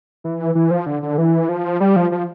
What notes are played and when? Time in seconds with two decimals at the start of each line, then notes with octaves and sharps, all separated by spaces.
0.24 E3
0.55 E3
0.71 F3
0.86 D3
1.02 D3
1.18 E3
1.49 F3
1.80 G3
1.96 F3
2.12 F3